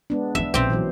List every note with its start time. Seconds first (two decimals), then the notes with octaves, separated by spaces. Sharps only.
0.10 G#3 B3 D4
0.35 E3 E4 E5
0.54 A#1 C4 C#4 G4 C5
0.70 E3 F#3 C5